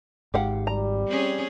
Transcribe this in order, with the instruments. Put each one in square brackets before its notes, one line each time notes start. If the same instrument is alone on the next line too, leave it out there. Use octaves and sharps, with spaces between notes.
[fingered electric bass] G#1 G#2 [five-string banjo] G4 F5 F#5
[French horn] G3 [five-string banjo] A#5
[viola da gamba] C4 C#4 G#4